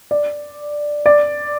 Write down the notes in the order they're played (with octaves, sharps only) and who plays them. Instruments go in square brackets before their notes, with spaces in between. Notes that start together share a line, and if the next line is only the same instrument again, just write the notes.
[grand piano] D5
D5